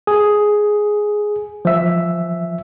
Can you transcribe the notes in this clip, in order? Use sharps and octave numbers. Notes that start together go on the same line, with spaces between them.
G#4
F3 E5